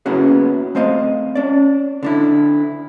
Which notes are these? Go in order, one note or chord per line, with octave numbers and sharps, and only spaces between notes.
A#3 B3 C#4 E4 F#4 G#4
A3 C4 C5 D#5 F5
C#4 D5
D3 D4 E4